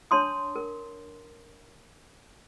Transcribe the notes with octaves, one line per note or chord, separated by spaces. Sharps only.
D4 C#5 A5 C6 D#6
A#4